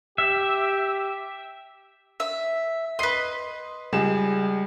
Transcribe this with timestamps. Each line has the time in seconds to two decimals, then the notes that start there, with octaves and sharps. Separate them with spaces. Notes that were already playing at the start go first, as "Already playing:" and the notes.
0.18 G4 E5
2.20 E5
2.99 B4 D#5 C6 C7
3.93 C#2 G3 G#4 E7